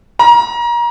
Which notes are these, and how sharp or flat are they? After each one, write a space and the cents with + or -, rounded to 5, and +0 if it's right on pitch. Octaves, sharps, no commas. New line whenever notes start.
A#5 +30